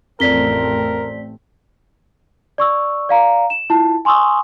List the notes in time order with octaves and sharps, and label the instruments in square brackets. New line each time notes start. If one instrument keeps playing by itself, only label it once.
[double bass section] A1 A3 C4 [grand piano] F2 [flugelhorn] A#4 [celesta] D5 B6 G7
[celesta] D5 C#6 E6
D5 F5 A#5
E7
E4 F4 A5
G#5 C6 C#6 D#6 E6